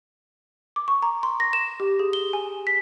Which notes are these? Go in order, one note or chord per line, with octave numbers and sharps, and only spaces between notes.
D6
C#6
A#5
C6
A#6
E7
G4
G#4
G7
G#5
B6